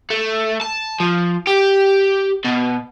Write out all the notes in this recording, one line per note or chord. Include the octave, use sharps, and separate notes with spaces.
A3
A5
F3
G4
B2